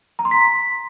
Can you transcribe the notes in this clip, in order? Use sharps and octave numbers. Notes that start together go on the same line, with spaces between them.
A#5
C6
B6